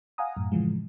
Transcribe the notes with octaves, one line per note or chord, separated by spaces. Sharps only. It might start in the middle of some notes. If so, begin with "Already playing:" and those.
F5 F#5 G#5 A#5 D#6
F#2 A2
A2 C#3 E3 F3 G#3